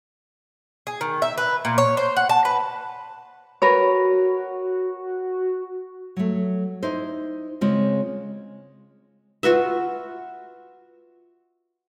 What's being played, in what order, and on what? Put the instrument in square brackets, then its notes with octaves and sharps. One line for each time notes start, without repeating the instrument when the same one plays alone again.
[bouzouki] G#4
D#3
E5
B4
A#2
C#5
C5
F#5
A5
B4
[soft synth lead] F#4 [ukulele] A#4 B4 C#5
[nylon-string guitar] F#3 A3
D#4 E4 C5
C#3 G#3 C4 F4
[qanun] F4 F#4 B4 E5